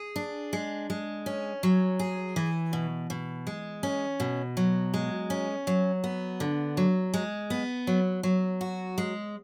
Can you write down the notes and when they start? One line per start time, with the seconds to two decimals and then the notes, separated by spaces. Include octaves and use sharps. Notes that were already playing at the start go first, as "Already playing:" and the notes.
Already playing: G#4
0.16 D4
0.53 G#3
0.90 G#3
1.26 C#4
1.63 F#3
1.99 G#4
2.36 E3
2.73 B2
3.10 B2
3.47 G#3
3.83 C#4
4.20 B2
4.57 F#3
4.94 G#3
5.30 C#4
5.67 F#3
6.04 B3
6.40 D3
6.77 F#3
7.14 G#3
7.50 B3
7.87 F#3
8.23 F#3
8.61 F#4
8.98 G#3